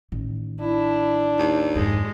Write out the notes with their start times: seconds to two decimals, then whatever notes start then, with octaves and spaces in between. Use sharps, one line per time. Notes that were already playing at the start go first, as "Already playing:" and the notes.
0.12 A1 D#3
0.60 D4 E4
1.39 D#2
1.76 F2 G#2 G#3